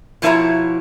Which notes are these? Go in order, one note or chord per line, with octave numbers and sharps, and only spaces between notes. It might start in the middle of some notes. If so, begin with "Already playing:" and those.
B2 F3 E4 C5 C#5 A#5